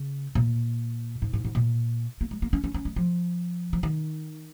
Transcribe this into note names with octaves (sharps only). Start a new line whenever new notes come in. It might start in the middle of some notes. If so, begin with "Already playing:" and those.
Already playing: C#3
A#2
G#2
G#2
G#2
A#2
A#3
G#3
A#3
C#4
C#4
C#4
G#3
F3
F3
D#3